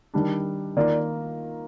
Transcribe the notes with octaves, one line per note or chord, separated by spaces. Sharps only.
D#3 G3 D4
D#3 A#3 F4 D5